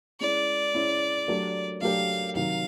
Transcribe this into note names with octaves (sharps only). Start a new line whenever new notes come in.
G#3 C#4 E4 D5
G#3 C#4 E4
F#3 A3 D4 G4 A#4
F#3 A3 D4 G4 A#4 F5
C3 D#3 F#3 F5